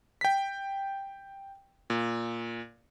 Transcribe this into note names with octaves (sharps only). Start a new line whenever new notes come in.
G5 B6
A#2